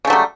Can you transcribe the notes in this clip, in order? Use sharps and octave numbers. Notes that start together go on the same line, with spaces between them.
C#3 F#3 G3 A3